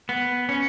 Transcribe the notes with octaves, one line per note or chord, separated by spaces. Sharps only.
B3
C#4